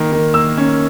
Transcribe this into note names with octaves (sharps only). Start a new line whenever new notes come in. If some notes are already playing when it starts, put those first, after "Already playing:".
Already playing: D#3 A#3
D#3
A#3 E6
C#4